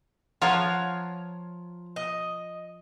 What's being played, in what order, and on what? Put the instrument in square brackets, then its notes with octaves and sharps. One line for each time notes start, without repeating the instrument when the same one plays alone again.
[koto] F3 F4 C#5 [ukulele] B4 F#5 [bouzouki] A#5
[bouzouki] D#5